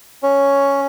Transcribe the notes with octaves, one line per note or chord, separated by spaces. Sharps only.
C#4 C#5